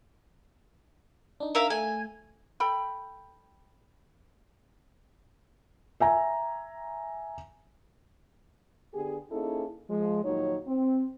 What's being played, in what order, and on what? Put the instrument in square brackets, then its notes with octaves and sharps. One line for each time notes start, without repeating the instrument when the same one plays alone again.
[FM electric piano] D4 D#4
[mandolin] A#4 E5 F5
[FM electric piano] A3 [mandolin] G#5
[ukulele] A4 G5 B5
[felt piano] E5 G#5 A#5
[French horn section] D3 B3 G4 G#4
A#3 C#4 D#4 E4 G#4 A4
F3 G#3
D#2 A#2 F3 F#3 D#4 C#5
C4